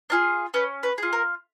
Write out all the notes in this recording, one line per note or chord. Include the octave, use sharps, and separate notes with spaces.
D4 F4 G#4
C#4 B4
B4
F4 G#4
A#4